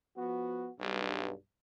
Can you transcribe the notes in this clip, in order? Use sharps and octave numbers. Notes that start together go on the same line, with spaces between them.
F3 B3 F#4
B1 G2